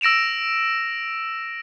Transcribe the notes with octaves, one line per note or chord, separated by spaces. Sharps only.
E6 A#6 D7 E7 F7